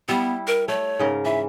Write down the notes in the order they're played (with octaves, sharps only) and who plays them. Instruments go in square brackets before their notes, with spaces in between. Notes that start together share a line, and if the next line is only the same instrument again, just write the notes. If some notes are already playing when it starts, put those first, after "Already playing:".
[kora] G3 E4 [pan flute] B3
[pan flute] A#4
[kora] A3 [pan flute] C#5
[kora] G#2 C#3 A#4
[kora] E3 [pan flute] E5